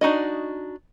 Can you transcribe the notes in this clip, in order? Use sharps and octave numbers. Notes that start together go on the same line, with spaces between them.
D4 D#4 F#4 D#5